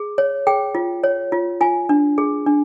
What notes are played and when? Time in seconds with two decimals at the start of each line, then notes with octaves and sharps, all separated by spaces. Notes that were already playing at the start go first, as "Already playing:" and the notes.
Already playing: G#4
0.18 C#5
0.47 G#4 G5
0.75 F4
1.04 C#5
1.32 F4
1.61 F4 G#5
1.89 D4
2.18 G#4
2.46 D4